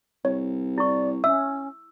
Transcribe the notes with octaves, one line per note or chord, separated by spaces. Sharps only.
C2 C#5
E4 D5 C#6
C#4 E5 E6